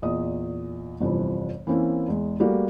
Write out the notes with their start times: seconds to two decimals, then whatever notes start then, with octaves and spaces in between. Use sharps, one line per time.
0.02 E2 A#2 D#5 D#6
1.00 G1 F2 C3 E3
1.67 E3 A#3 C4 C#4 E4
2.08 E2 G#3
2.40 G3 A3 A#3 F#4 G4